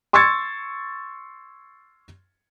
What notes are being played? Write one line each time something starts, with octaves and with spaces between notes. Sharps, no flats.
C6 C#6 E6 G#6 A6 C#7